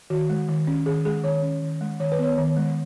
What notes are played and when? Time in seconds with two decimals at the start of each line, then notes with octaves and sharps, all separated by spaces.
0.10 D#3 F#4
0.30 G#3
0.49 D#3
0.67 C#4
0.86 D#3 G#4
1.05 G#3 G#4
1.24 D#3 C#5
1.43 C#4
1.62 D#3
1.81 G#3
2.00 D#3 C#5
2.12 B4
2.19 B3 C#5
2.38 D#3
2.57 G#3